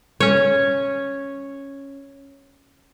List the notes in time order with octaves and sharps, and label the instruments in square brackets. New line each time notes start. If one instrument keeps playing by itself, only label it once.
[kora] C#4 C#5